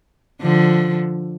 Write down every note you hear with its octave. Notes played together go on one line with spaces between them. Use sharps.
D3 F3